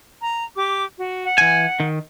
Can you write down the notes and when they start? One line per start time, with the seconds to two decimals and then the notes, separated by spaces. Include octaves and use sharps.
0.21 A#5
0.57 G4 D6
0.97 F#4
1.25 F#5
1.38 E3 G#5
1.80 D#3